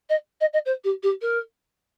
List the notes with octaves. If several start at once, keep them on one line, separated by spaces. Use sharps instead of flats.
D#5
D#5
D#5
C5
G4
G4
A#4